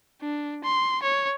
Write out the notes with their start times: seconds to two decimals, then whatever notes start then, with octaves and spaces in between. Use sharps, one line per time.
0.21 D4
0.64 C6
1.02 C#5